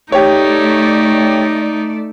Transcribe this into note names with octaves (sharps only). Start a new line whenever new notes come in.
A3 D#4 G4 C#5 D5